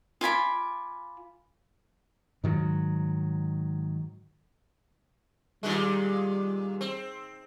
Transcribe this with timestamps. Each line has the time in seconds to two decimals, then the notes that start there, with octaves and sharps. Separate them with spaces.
0.21 F4 G#5 B5 D6
2.44 G#2 D#3 F#3
5.63 A#2 D#3 G3 G#3
6.81 C4